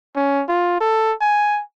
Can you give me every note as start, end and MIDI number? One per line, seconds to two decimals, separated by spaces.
0.16 0.43 61
0.49 0.80 65
0.81 1.13 69
1.21 1.61 80